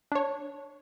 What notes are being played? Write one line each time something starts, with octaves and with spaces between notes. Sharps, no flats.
D4 C#5